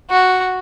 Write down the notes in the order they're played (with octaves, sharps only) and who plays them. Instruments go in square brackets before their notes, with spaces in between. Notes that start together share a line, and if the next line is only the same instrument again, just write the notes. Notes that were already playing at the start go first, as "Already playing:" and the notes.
[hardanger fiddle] F#4